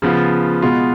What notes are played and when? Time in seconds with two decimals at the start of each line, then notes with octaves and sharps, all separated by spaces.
0.02 C#3 F3 B3 F4
0.62 B2 G#3 B3 F4